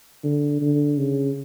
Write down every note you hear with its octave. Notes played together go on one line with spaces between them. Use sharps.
D3
D3
C#3